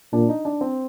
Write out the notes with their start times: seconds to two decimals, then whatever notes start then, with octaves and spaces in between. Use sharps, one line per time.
0.13 A#2 D4
0.29 D#4
0.45 D4
0.61 C4